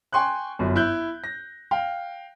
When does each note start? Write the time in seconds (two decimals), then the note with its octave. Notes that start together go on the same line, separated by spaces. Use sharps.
0.12 G5 G#5 C6 C#6 F#6
0.59 G1 F#2
0.76 E4 F#6 G6
1.24 A#6
1.71 F5 G5